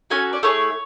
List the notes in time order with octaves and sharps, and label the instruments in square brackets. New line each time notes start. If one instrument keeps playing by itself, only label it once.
[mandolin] C#4 F#4 A4 G#5
D5
A3 E4 G#4 C#5